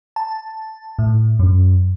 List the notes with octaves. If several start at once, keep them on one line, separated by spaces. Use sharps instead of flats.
A5
A2
F#2